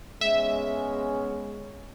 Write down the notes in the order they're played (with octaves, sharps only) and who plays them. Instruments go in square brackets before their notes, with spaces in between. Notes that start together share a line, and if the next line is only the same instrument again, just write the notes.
[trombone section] G#3 B3 C#4 [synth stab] E5